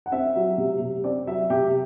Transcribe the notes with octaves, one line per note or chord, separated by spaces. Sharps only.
F#5
C4 E5
F#3
C3
C3
C4 D5
F#3 E5
C3 G4